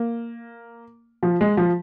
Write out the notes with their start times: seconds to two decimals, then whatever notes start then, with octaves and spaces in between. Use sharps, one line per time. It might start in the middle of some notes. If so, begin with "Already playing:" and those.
Already playing: A#3
1.23 F3
1.41 G#3
1.57 F3